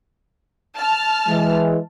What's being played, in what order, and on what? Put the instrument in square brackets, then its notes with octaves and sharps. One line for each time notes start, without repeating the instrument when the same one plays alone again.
[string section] A5 F6
[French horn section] E3 G#3